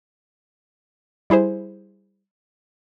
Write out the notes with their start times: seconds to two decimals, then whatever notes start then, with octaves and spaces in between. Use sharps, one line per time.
1.30 G3 E4 G#4 C5